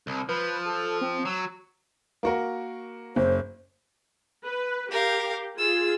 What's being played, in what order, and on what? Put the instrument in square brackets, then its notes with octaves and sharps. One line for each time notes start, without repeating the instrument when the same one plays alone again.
[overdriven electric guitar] C2
[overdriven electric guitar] F3 [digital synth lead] B4
[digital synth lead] A4
C4
[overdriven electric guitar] F#3 [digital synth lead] E6
[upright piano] A#3 F#4 A#4
[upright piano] F#1 [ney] C5
[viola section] B4
[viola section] G4 [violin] A#4 F5
[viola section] F4 G#4 [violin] E6